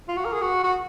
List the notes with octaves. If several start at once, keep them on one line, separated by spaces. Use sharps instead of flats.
F4
F#4
A#4
G#4
F#4
F#4